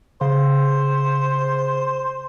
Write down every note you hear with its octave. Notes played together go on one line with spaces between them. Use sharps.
C#3 C5